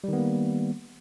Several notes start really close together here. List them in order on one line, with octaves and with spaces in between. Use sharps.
G3 D#3 B3 A#3